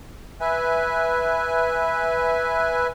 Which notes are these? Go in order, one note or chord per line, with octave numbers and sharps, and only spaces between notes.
B4 E5 G#5